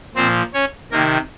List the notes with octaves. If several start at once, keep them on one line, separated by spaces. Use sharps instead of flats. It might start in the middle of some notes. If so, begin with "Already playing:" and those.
A#2 F3 C4 C5
C#4 C#5
C3 D#3 A#3 A#4